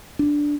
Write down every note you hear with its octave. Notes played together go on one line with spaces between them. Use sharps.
D4